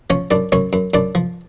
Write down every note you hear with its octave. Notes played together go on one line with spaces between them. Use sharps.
F3 C#4 C#5
F#2 D4 D5
F#2 C#4 C#5
F#2
F#2 D4 D5
F3